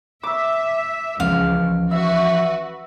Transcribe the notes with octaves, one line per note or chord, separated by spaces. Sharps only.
E5 D6 E6
C#2 E3 F3 C#4 F5
F#4 B4 E5